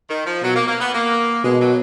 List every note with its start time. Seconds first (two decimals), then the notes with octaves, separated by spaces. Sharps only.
0.09 D#3
0.26 F3
0.42 B2 F#3
0.56 A#3
0.67 A#3
0.80 B3
0.93 A#3
1.44 B2 G#3
1.60 F#3